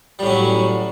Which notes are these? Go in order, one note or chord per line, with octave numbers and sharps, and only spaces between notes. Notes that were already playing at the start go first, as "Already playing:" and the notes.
A2 F#3 G3 C#4